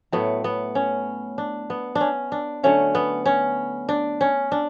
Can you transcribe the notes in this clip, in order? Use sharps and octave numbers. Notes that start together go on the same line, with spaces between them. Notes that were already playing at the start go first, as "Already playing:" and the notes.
A2 F#3 A3 B3
B3
C#4
D4
B3
D4
C#4
D4
D3 F#3 A3 C#4
B3
C#4
D4
C#4
D4